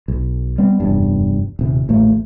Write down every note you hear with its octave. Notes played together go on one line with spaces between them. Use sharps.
B1
G3 B3 C4
F1 E2 G2
D#1 C3
D#1 A1 A3 A#3